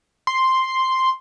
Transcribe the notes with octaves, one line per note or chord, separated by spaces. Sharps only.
C6